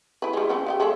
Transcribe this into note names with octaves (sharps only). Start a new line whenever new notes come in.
E4 B4
G3 G#3
C#3 F3 C4
C#3 E4 G4
G#3 A4 E5